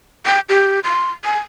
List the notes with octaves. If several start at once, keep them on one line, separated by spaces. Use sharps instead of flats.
G5
G4
C6
G#5